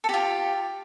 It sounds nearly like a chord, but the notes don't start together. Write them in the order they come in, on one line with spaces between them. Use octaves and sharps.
A4 G4 F4